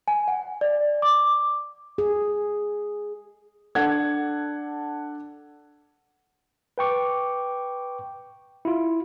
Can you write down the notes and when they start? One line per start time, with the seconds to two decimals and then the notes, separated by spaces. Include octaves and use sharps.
0.08 G#5
0.28 F#5
0.61 D5
1.02 D6
1.98 G#4
3.75 D4 A4 F#5 G#6
6.78 B4 G5 C#6 D6
8.65 E4 F4